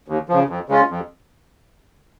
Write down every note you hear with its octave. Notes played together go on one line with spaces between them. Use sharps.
D#2
C#3 F3
F2
C#3 G#3 C#4 F4
F2